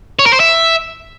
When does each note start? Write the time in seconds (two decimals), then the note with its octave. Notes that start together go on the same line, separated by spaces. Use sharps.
0.19 C#5
0.26 A#4
0.33 C5
0.40 E5